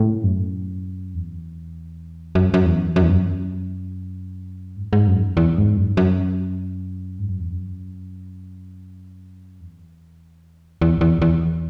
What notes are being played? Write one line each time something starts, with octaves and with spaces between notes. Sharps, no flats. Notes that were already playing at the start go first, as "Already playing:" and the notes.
Already playing: A2
F#2
E2
F#2
F#2
E2
F#2
E2
F#2
G#2
G#2
F#2
E2
G#2
F#2
F#2
G#2
F#2
E2
F#2
E2
E2
E2
E2